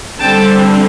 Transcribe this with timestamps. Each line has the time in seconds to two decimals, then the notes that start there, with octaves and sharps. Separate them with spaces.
0.20 D3 G3 C4 G5 A5